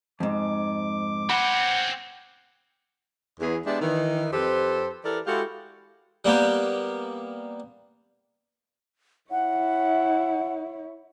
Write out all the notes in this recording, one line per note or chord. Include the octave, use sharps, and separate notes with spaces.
F2 G#2 D6
C4 C#4 F#5 B5
E2 G#4
G#3 B3 D4 G4 D5 E5
D#3 E3
F2 C4 G4 A4 B4 C5
E3 G4 A4 A#4 D5
G#3 E4 F#4 G4 A4 F5
G3 A#3 B3 G4
E4 C#5 F#5